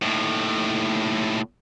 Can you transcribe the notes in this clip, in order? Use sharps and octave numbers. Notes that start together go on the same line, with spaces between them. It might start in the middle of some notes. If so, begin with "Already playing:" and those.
D#2 A2